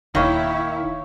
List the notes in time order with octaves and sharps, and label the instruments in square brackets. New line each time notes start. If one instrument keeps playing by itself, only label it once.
[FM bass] D#1 [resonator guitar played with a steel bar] D#3 A#3 [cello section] E4 [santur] C#5 F5